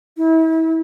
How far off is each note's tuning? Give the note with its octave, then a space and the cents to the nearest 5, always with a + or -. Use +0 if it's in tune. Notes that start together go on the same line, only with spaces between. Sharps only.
E4 -35